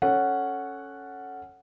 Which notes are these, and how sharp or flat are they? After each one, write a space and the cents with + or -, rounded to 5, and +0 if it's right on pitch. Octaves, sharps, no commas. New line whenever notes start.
C#4 +0 A4 +0 F#5 +0